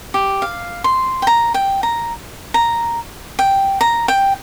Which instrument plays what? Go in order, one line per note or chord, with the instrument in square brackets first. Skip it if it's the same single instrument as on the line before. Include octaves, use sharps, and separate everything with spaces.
[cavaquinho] G4
F5
C6
G5
A#5
G5
A#5
A#5
G5
A#5
G5